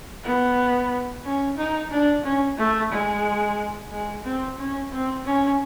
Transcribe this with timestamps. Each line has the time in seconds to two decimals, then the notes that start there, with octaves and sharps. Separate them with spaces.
0.24 B3
1.24 C#4
1.58 D#4
1.91 D4
2.24 C#4
2.58 A3
2.92 G#3
3.92 G#3
4.25 C4
4.59 C#4
4.92 C4
5.25 C#4